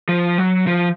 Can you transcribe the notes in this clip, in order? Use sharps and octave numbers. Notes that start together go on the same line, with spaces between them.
F3
F#3
F3